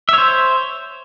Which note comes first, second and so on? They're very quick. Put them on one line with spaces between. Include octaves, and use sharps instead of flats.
E5 C#5 C5